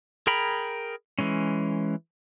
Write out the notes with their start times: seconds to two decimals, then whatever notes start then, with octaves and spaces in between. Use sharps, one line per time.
0.27 G#4 A#4 G5 A#5 B5
1.19 E3 G#3 C#4